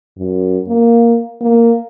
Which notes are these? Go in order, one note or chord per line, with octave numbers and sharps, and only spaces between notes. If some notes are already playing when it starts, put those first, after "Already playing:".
F#2
A#3
A#3